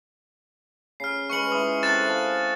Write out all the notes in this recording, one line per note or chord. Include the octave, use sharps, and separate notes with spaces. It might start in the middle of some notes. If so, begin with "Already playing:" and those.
C#3 F6 C7
G#3 B4 F#5 C#6 C#7 F#7
G#3 E4 D#6
C3 A4 F#6 A6 E7
F5 G#5 A5